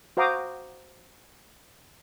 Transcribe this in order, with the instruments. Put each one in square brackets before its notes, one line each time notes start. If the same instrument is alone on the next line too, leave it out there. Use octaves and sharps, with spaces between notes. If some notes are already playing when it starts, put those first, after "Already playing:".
[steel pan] F#4 C5 F5 A#5 D6 D#6